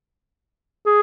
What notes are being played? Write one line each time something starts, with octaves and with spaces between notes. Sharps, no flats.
G#4